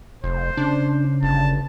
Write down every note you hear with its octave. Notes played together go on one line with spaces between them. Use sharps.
F1 C5
C#3 D4
G1 A5